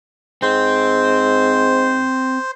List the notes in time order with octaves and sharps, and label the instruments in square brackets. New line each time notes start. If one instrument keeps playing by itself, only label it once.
[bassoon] G#2 [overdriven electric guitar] C4 [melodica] C5